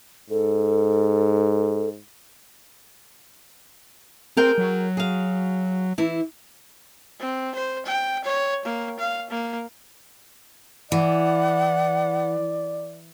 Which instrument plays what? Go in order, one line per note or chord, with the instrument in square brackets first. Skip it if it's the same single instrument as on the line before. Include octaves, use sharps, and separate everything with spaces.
[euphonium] G#2 [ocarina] A4
[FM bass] C4 [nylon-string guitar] G#4 A#4 G5
[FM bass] F#3
[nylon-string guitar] G#4 F5
E3 E4
[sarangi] C4
C5
G5
C#5
A#3
F5
A#3
[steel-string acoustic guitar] E3 [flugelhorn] D5 [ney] F#5